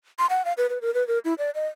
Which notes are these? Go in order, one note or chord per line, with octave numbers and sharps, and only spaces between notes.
C6
F#5
F5
B4
B4
A#4
B4
A#4
E4
D5
D#5